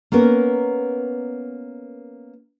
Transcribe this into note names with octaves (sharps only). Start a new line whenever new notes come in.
A#3 B3 C#4 A#4